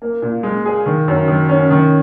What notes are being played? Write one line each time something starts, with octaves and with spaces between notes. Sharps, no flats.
A#3
A#2
G#3
G#4
D#3
F#2
D#3
C#4
D#3